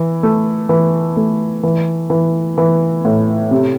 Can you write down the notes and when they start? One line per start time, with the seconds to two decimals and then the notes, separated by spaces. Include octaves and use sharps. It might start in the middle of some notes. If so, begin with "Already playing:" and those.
Already playing: E3
0.23 A3
0.69 E3
1.17 A3
1.63 E3
2.10 E3
2.58 E3
3.05 A2
3.51 C3